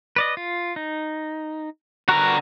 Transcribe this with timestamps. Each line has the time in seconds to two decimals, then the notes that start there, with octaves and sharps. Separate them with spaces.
0.16 B4 D5 D#5
0.37 F4
0.76 D#4
2.09 D3 F#4 A#4 B4 A#5